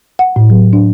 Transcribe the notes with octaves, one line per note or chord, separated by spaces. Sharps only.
F#5
A2
F#3
D4